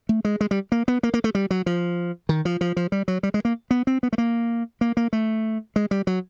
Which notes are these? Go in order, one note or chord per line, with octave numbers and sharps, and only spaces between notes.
A3
G#3
G#3
G3
A#3
B3
A#3
A#3
A3
G3
F#3
F3
D#3
F3
F3
F3
G3
F#3
G3
G#3
A#3
B3
C4
B3
A3
A#3
A#3
A#3
A3
G#3
G3
F#3